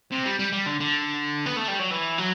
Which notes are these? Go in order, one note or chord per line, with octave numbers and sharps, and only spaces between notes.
C3
G3
G3
G3
D3
D3
B3
A3
G3
F#3
E3
F#3